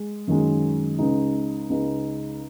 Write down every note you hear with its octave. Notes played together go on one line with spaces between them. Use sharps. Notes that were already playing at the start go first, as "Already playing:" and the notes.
Already playing: G#3
F#2 D#3 G#3
C#2 C#3 G#3 D#4
C#2 C#3 G#3 D#4